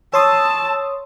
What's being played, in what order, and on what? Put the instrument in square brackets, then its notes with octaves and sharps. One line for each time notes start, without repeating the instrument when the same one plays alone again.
[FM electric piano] C#5 C6 D#6 [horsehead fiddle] A5 [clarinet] E6